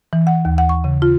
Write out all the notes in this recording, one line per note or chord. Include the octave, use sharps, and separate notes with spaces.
E3
F#5
D#2
F#5
C#6
C#3
F4